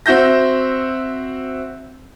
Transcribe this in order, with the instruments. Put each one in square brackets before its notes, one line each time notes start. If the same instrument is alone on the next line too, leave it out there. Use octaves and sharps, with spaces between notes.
[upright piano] C4 F#4 E5 G6 A#6